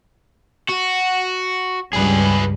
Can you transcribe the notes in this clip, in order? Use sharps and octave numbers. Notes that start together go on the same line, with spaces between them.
F#4
C#2 G2 G3 G#4 B4